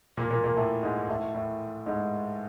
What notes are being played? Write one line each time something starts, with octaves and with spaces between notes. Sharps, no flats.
A#2 A#3
A#2 A#3
A#2 A#3
A2 A3
G#2 G#3
A2 A3
A2 A3
G#2 G#3